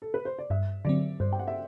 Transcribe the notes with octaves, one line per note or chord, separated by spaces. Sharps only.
A4
B4
C5
D5
G2 E5
D3 F#3 C4 D5
G2 C5
G5
F#5
E5